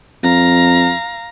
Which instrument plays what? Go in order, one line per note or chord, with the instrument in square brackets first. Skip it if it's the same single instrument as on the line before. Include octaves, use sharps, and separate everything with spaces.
[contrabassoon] F2 [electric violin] F5 A#5